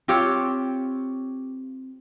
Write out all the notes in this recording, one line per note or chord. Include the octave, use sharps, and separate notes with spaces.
C4 F4 G4 C#5